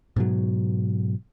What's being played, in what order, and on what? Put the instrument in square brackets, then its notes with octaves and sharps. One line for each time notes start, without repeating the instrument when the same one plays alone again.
[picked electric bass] G#2 B2 F#3